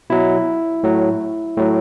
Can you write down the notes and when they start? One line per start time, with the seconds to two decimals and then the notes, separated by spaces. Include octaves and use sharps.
0.10 B2 F#3 E4
0.83 A2 F#3
1.57 A2 F#3